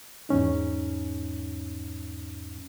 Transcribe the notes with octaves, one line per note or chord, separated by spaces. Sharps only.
E2 G#2 C#4 D#4